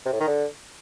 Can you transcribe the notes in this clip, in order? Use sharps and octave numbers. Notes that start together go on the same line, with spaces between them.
C3
A2
D#3
D3